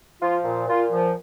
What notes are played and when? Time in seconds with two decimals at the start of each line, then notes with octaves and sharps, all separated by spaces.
0.20 F3 F4
0.44 A#2
0.67 A#2 F4
0.90 F3